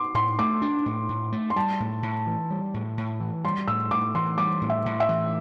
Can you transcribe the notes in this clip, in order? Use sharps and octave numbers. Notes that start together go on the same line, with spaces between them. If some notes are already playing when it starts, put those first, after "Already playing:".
Already playing: C6 D6
A2 C6
A3 D6
D4
A2
A2
A3
C6
G3 A5
A2
A2
E3
G3
A2
A2
E3
G3 C6
A2 E6
A2 D6
E3 C6
G3 D6
A2
E5
A2
E5
E3